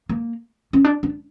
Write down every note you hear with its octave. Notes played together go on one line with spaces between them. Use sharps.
A#3
C#4
D4
D4